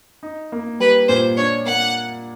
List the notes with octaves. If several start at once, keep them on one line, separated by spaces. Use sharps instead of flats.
D#4
A#3
G3 B4
A#2 C5
D4 C#5
A#3 F#5